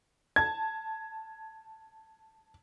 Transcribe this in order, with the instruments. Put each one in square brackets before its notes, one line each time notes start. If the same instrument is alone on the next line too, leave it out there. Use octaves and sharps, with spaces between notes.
[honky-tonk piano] A5 [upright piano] G#6